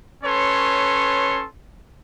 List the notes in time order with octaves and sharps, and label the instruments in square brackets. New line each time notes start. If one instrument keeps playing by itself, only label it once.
[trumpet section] C#4 A4 B4 C#5 C6